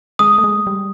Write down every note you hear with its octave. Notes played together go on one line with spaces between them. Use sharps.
G#3 D#6
A3
G#3
G3